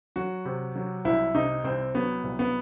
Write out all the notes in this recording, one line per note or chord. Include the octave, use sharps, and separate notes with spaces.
F#3 F#4
C3
F#3
C2 E4
C3 D#4
C2 C4
F#3 B3
C2
B3